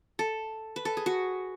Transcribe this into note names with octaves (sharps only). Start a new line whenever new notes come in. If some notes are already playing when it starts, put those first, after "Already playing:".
A4
B4
A4
G#4
F#4